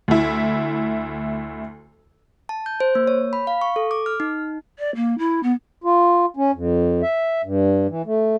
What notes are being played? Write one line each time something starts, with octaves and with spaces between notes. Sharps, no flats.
D2 E4
A5
G6
C5
A#3
C#5
B5
F5
C#6
A4
D6
F6
D#4
D5
A#3
E4
B3
F4
C#4
F2
E5
G2
E3
A3